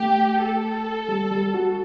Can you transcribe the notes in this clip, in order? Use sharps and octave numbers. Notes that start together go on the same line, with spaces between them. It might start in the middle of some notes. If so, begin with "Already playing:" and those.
Already playing: A3 G4
A4
G3
G3
F#4